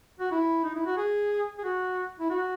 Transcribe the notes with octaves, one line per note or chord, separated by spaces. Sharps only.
F#4
E4
D#4
E4
F#4
G#4
G#4
F#4
E4
F#4